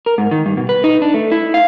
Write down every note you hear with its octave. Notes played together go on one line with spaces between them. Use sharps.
A#4
G#2
D#3
G2
B2
B4
D#4
D4
A3
E4
F5